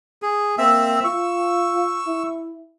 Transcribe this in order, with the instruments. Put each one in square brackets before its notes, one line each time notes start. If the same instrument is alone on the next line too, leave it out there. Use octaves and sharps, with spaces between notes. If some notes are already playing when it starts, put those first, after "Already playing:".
[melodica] G#4
[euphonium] A#3 [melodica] C4 E5 E6
[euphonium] F4 [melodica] C#6 E6
[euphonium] E4